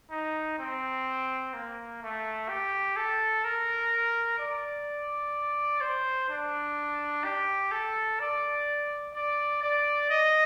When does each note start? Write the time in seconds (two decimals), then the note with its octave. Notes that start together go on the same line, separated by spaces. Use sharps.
0.11 D#4
0.59 C4
1.54 A#3
2.02 A3
2.49 G4
2.96 A4
3.44 A#4
4.39 D5
5.81 C5
6.30 D4
7.24 G4
7.71 A4
8.20 D5
9.15 D5
9.62 D5
10.10 D#5